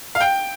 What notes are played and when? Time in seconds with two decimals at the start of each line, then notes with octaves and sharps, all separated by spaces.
0.15 F5
0.21 G5